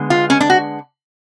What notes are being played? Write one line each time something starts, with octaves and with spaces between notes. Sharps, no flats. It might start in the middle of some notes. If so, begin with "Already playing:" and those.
Already playing: D3 G#3 B3
F4
C#4
D4
F#4